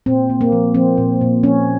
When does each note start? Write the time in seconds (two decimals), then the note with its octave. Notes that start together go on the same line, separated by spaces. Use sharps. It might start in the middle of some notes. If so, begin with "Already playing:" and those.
0.06 A#2 C4
0.30 A#3
0.41 A#3
0.52 F3
0.74 F3 C4
0.98 A#2
1.21 A#2
1.43 F3 C#4